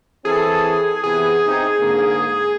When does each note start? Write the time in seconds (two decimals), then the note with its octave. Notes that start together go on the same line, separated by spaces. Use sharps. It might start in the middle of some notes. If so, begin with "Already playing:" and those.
0.25 E3 C4 G#4 A4
1.03 C3 E3 B3 G#4
1.45 C3 D#4
1.79 G#2 D3 A#3